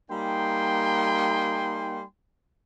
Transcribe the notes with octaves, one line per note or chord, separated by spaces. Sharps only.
G3 A#3 D#4 G5 G#5 C6